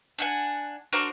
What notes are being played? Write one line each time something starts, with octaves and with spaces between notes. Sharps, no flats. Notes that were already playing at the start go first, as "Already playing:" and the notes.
D4 F#5 G#5
D4 F#4 A#4 C5